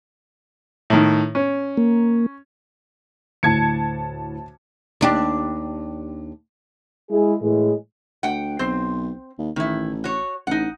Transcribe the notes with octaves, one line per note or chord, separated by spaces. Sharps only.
A2 D#3
C#4
A#3
D2 A2 A5 G#6 C#7
D#2 D4 G4
G#3 E4 G#4
A2 E3 G#3
D2 F#5 G5
B1 C4 C5
D#2
A1 D#3 E4
F#4 C#5
A1 D#4 F#5